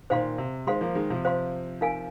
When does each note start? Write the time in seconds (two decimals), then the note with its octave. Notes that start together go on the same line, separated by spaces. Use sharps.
0.10 A#2 D#3 C5 F5 C6
0.38 C3
0.67 D#3 G#3 C5 F5 C6
0.81 F3 A#3
0.95 D#3 G#3
1.10 C3 F3
1.25 C5 F5 C6
1.81 D#4 A#4 F5 G#5